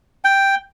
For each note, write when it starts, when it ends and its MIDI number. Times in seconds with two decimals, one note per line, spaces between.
0.25 0.55 79